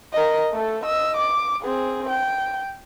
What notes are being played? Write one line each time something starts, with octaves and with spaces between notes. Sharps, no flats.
A#4 D#5
A3 A4
D#5 E6
D6
C4 G#4
G5